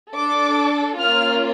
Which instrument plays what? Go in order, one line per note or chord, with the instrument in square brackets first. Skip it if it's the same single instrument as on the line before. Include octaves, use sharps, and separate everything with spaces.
[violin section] D4 A4 D6
A#3 C#4 F4 F6